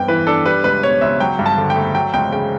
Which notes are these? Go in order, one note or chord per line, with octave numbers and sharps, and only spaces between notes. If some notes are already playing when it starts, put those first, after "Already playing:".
Already playing: G2 B3 G5
E3 B4
D4 A4
G3 B4
C#2 B4
B2 C#5
C#2 E5
F#3 G5
G2
A5
D3
G5
A3
F#3 G5
C#2 G5
C#3 G5